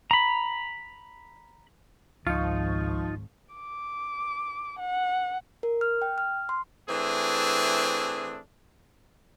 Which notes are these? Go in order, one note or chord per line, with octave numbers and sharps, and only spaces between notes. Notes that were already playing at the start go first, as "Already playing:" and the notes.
A#5 B5
G#1 C#2 F3 D#4 F4 F5 C#6
D6
F#5
A#4
F6
G5
F6
C6
E3 A3 C4 D4 G#4